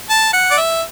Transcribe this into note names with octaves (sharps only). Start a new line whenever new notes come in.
A5
F#5
D5
E5